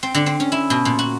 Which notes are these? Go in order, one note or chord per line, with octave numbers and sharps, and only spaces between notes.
C4
D3
C4
C#4
E4
B2
A#2
F#4